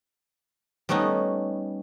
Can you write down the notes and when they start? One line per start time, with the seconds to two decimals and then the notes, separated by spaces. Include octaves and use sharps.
0.89 G3 A3 B3 C#4 D#4